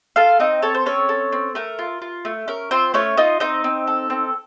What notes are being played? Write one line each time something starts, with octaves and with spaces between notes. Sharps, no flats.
F4 A4 F5
C4 D#4 D#5
A4 C#5
C5
C4 C#4 C#5
A4
C4
A3 A#4
F4
F4
A3
C#4 A#4
C4 F4 C5
A3 C#4 C#5
D#4 F4 D#5
C4 D#4 D#5
C4
A4
C4